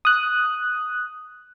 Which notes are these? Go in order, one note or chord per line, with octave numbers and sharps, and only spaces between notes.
D#6 F#6